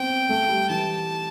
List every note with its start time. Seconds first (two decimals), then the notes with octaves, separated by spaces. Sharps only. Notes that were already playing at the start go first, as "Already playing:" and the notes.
Already playing: B3 C4 G5
0.29 A3
0.45 A3
0.49 G3
0.70 E3 A5